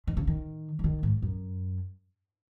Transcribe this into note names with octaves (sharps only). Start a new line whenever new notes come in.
D#3
C#3
D#3
E3
D#3
G#2
F#2